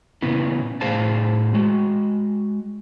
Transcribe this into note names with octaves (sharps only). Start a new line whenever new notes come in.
A#2 C#3 B3 E4
A2 G#4 C5 F5 A5
G#3 F#4